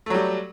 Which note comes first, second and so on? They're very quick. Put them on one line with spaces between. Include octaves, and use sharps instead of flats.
A3 F#3 G3